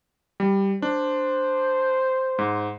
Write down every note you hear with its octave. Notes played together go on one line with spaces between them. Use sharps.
G3
D4 C5
G#2